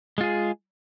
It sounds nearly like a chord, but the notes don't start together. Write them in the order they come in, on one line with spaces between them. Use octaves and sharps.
G#3 F4 G#4